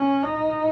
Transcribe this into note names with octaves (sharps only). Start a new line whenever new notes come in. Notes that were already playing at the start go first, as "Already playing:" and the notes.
Already playing: C#4
D#4